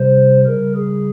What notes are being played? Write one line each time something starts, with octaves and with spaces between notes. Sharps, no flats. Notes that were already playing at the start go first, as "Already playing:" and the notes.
Already playing: C3 G3 C5
C#3 G3 A#4
G#4